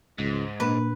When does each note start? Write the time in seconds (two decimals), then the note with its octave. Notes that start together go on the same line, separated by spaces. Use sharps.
0.18 C#2 G#2
0.60 A#2 A#3 D4 B4